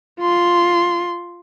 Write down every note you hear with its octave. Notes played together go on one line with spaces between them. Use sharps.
F4 C6